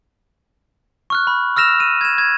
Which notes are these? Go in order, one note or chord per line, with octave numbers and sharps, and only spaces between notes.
C#6 F6 F#6
B5
E6 F6 A#6 E7 F7
D#7
G#6 E7
G#6